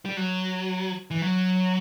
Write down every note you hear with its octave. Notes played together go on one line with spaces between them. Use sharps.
G3
F#3
E3
F#3